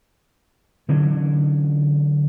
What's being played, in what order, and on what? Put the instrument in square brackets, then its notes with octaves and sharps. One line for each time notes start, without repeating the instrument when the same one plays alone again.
[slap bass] D3 E3 F#3 C#4